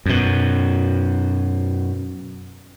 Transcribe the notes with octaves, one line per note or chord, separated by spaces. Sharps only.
F#2 B2